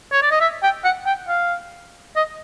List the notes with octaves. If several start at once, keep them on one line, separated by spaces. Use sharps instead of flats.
C#5
D5
D#5
E5
G5
F#5
G5
F5
D#5